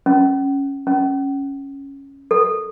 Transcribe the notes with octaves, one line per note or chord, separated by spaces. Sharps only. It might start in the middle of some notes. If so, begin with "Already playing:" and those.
C#4
C#4
A4